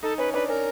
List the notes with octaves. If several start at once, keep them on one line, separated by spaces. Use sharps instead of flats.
D#4 A4
C#4 B4
D4 B4
C#4 A#4